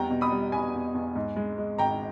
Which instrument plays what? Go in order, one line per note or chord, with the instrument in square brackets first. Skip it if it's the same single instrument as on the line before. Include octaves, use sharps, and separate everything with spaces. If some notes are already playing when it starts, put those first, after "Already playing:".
Already playing: [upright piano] E2 G3 G5 A#5
B2
B5 D#6
G3
E2 G#5 B5
E2
E2
G#2
G#3
G#3
G#1 G5 A#5